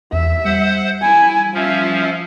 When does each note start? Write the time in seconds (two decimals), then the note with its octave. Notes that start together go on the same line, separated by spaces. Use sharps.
0.13 E2 E5
0.45 G3 C5 F#5
1.03 E4 G#5
1.54 F3 C#4 F4 E5